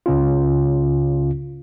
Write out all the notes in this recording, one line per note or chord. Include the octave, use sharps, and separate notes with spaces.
C#2 C#3 C#4 F4